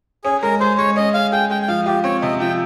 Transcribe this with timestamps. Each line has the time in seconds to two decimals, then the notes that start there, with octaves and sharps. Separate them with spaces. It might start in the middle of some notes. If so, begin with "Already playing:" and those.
0.24 C#4 G#4
0.42 G#3 A#4
0.60 G#4 C5
0.78 G#3 C#5
0.96 C#4 D#5
1.14 G#3 F5
1.32 G#4 G5
1.50 G#3 G5
1.62 G5
1.68 F3 F5
1.86 F4 G4
2.04 C4 C#5
2.22 C3 D#5
2.40 F3 G5